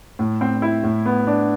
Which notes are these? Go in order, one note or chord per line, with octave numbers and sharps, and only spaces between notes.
A2
C4
E4
A2
B3
D4